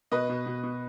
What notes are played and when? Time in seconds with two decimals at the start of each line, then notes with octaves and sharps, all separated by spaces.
0.11 B2 B4 D#5
0.29 B2
0.46 B2
0.63 B2